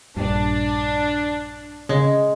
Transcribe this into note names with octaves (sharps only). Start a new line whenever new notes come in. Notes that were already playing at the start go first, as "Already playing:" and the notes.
A#1 G2 D4
C#3 G#3